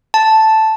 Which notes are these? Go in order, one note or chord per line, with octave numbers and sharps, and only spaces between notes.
A5